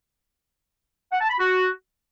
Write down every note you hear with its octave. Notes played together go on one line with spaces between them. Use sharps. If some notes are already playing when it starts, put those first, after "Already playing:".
F#5
A5
B5
F#4